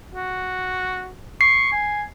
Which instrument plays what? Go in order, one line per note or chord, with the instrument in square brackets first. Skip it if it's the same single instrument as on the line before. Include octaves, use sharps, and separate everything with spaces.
[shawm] F#4
[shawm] C#6 [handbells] C7
[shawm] G#5